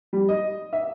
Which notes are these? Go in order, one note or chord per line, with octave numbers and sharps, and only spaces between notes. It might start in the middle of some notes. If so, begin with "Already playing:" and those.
G3
D#5
E5